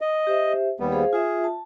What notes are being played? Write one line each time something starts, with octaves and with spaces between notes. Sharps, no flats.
D#5
G4 C5 E5
D#2 G3 B3
G#4 C5 F5
F4 G#4 E5
A5